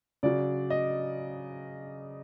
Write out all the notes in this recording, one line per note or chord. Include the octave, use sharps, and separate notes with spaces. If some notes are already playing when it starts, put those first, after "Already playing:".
C#3 F#3 D5
D#5